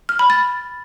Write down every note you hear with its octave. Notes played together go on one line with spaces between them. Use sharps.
F6
B5
A6